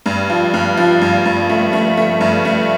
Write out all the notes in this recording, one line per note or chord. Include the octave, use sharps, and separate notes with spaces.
G2
F3
G2
F3
G2
G2
A3
A3
A3
G2
A3